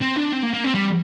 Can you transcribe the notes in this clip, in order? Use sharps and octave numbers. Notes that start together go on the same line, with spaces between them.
C4
D4
C4
A#3
A#3
C4
G3